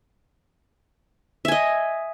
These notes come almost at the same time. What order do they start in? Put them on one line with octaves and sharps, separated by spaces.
E5 G#5 D#5